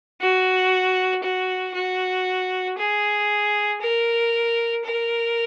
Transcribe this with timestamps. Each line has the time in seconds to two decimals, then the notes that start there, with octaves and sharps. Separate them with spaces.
0.21 F#4
1.23 F#4
1.74 F#4
2.78 G#4
3.81 A#4
4.84 A#4